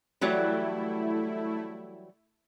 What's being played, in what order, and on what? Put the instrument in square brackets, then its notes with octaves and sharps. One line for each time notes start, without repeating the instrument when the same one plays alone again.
[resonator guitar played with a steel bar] E3 F#3 G3 [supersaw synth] A3 E4